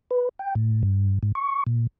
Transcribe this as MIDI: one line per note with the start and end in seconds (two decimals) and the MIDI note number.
0.11 0.29 71
0.39 0.54 79
0.55 0.82 45
0.83 1.19 43
1.23 1.32 44
1.35 1.63 85
1.67 1.87 46